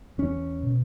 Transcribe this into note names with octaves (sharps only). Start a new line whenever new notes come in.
E2 C#4
B2